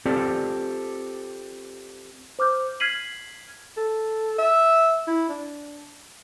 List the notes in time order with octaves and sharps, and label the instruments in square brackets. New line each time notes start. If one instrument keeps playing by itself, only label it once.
[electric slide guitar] C4 F4 G4 A4 C5 D5
[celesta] C5 D6 F6 G6
F6 G#6 B6 C7 D#7 F#7
[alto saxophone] A4
E5
E4
D4